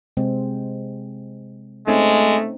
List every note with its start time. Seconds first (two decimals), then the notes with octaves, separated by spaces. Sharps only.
0.17 C3 G#3 C4
1.87 G#3 A3 C4 C#4 D#4